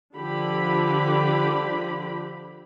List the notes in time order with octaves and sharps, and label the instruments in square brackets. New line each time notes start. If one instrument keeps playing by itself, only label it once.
[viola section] D3 F3 G4 B5